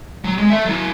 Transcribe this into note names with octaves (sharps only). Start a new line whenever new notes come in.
F#3
G#3
A4 E5
F#3 E4